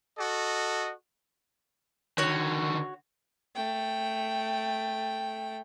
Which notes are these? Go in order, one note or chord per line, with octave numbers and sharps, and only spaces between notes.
F#4 A4 D#5
D3 D#3 F#4 C#5
A3 G5